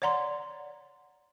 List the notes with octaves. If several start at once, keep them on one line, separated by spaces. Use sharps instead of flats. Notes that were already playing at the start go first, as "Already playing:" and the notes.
C#5 D5 F#5 A#5 C6